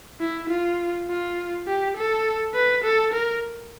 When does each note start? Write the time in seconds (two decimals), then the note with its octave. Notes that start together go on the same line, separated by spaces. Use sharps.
0.20 E4
0.50 F4
1.08 F4
1.67 G4
1.96 A4
2.55 B4
2.84 A4
3.13 A#4